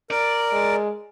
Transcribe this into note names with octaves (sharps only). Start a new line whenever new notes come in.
A#4 D5
G#3